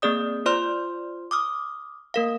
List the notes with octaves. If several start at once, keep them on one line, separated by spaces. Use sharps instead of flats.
A#3 C4 G#4 D5 D#6
F4 C5 D5 C6 F6
D6 D#6 F6
A#3 A#4 F5